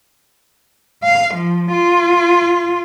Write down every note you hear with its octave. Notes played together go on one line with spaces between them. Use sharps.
F5
F3
F4